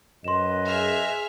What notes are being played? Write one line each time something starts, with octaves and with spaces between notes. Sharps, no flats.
F#2 B4 C5 D#5 C6 E7
G#4 E5 F6